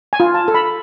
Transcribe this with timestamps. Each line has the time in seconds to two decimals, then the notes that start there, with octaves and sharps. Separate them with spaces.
0.13 G#5
0.20 F4
0.34 A5
0.48 A4
0.55 B5